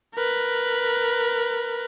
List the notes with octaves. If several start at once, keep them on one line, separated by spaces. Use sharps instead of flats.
A#4 B4